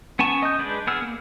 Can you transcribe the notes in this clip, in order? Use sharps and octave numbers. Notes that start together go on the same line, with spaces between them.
B3 C#4 G#5 A5 C#6
D#5 D#6 G6
G#3 D4 B4 G6
B3 G#4 E6 F6
A#3